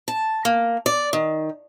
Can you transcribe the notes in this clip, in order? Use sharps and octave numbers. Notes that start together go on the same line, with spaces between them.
A5
A#3
D5
D#3